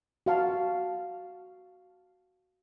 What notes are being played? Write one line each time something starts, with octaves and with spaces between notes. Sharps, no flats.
F#4 F5 A5